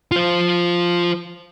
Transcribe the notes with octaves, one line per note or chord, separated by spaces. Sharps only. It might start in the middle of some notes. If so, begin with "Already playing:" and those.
F4 C5